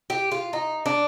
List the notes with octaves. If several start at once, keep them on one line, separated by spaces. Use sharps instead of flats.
G4
F4
D#4
D4